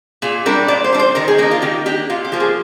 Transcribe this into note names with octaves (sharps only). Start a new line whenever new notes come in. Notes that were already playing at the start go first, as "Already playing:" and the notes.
A#2 G#4
G3 D4 A#4
A#2 D5
C5
G3 D4
C5
D#3 A#4
G#4
A#3 D4 D#4
F4
D#3 G4
A#3 D4 G4
A#2 F4
G4
F3 A#3
G#4